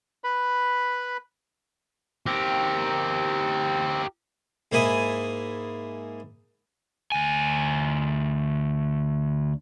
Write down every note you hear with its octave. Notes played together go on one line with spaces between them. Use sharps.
B4 B5
C4 G4 A#4
G#2 A#3 E4 G#5 D#6
D2 G#5